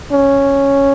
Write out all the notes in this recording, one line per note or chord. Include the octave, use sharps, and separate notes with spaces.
C#4